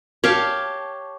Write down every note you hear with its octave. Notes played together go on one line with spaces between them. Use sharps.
G4 C#5 F5 A5